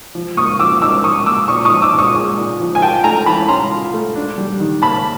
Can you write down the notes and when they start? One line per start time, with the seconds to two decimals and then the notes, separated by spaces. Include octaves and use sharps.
0.15 F3
0.37 A#3 C#6 D#6
0.59 F3 D6 E6
0.82 D#4 D6 E6
1.04 F3 C#6 D#6
1.26 A#3 D6 E6
1.48 A#2 C#6 D#6
1.65 C#6 D#6
1.71 F3
1.82 D6 E6
1.93 A#2
1.98 C#6 D#6
2.15 G#3
2.37 A#2
2.60 F3
2.75 G#5
2.82 F4 G5 A5
3.04 A3 G#5 A#5
3.26 E3 A5 B5
3.48 C#4 A#5 C6
3.71 F4
3.93 A3
4.15 D4
4.38 G3
4.60 D#3
4.82 A#3 A5 B5